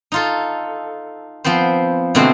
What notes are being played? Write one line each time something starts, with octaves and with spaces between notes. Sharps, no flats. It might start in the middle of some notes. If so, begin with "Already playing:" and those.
D#4 F4 A4
F3 B3 C4 C5
B2 D3 E3 A3 C4